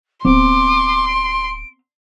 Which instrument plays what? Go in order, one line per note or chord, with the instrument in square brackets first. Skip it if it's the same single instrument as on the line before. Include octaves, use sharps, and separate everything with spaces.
[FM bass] D1 [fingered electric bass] B3 C4 [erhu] C6 [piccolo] D6
[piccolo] D7